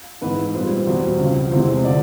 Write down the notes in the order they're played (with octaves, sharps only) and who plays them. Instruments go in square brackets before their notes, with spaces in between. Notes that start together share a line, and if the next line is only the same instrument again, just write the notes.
[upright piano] G#2 E3 G#3 B4
A#2 G3 C5
E2 B2 G3 C5
C#2 C#3 F3
E2 C3 E3 G#3 C5
D3 F3 D5